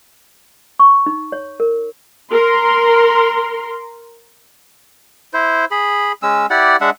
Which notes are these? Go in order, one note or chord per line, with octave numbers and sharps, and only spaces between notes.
C#6
D#4
C#5
A#4
A#4 C6
E4 C5
G#4 B5
G#3 C#4 E6
E4 G4 D5 F#5
G#3 D4 E5 F#5